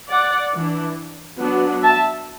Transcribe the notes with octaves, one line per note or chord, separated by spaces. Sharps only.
D5 F#5
E3 D4
F#3 B3 D4
E5 A5